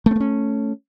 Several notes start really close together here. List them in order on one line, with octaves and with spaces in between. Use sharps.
A3 C4 A#3 C#4